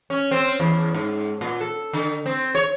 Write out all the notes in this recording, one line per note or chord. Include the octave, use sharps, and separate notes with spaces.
C#4
C4
E2
G#2
A#2
A4
D3
C4
C#5